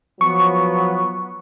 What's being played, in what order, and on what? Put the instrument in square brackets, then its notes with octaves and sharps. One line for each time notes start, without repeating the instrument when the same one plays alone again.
[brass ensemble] F3 F#3 B3 [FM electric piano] C#6